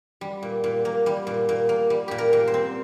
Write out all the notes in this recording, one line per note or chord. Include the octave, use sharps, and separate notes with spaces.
G3
A#2
A#2
A#3
G3
A#2
A#2
A#3
G3
A#2 G4
A#4
A#2
C5
C4